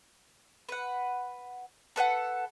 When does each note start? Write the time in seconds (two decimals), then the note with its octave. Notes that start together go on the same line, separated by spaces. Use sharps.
0.69 B4 F#5
1.96 A4 B4 D5 F#5